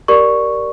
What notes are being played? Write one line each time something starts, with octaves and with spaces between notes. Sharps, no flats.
G4 A#4 D5 C#6